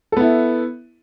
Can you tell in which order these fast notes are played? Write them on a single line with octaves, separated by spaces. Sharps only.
A4 B3 E4